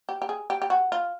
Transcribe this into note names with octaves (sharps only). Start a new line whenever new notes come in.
G4
G4
G#4
G4
G4
F#4
F4